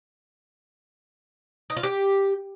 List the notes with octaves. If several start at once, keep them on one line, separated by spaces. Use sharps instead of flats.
D#4
F4
G4